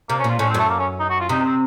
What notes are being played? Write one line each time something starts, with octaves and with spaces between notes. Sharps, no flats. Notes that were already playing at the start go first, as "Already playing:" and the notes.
C3 A#3
C#4
A#2 F4
A2 C#4
C4
F#2 A3
A#3
C#4
D#4
F#4
F4
C3 D#4
C4